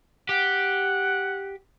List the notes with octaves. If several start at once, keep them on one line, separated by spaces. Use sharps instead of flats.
G4 F#5